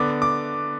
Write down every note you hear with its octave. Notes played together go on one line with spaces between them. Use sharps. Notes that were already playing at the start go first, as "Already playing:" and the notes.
Already playing: D3 B3 D6
D6